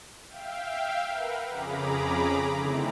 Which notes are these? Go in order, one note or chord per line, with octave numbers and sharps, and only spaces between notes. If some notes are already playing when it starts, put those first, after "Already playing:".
E5 F5 G5
A#4 B4 F#5
F2 C#3 G#4 A#5 B5 D6
D3 D#3 A3 C4 E4